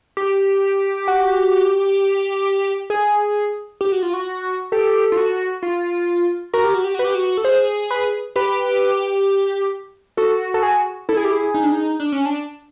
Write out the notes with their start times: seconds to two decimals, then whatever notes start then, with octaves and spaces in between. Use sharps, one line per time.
0.17 G4
1.08 F#4
2.90 G#4
3.81 G4
3.92 F#4
4.03 F4
4.14 F#4
4.72 G4 A4
5.12 F4
5.17 F#4
5.62 F4
6.53 F#4 A#4
6.64 G4
6.74 F#4
6.84 G4
6.95 F#4 B4
7.05 G4
7.15 F#4
7.37 A4
7.44 G#4 C5
7.90 B4
8.36 G4 B4
10.17 F#4 A4
10.54 A4
10.63 G#4
11.09 E4 A4
11.17 G#4
11.25 G4
11.32 G#4
11.54 D#4
11.64 D4
11.72 D#4
12.00 D4
12.12 C#4
12.26 D4